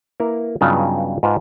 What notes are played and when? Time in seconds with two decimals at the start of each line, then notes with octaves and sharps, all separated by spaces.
0.20 A#3 E4 A#4 B4
0.61 G2 C#3 F#3 B3 D#4 F4
1.23 G#2 F4 B4 C5 A5